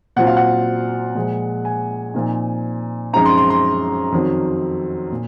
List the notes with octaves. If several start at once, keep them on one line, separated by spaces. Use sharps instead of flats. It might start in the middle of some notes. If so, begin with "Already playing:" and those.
A#2 F#3 C4 F4 F#5
F5
F#5
A#2 F3 G#3
G#5
A#2 F3 C4 D#4
F#2 F3 G#3 C4 D#4 A#5
C6
C6
C6
F2 D#3 F#3
A#2